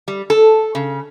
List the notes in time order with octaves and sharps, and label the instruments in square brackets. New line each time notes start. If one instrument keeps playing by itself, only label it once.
[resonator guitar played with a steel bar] G3
A4
C#3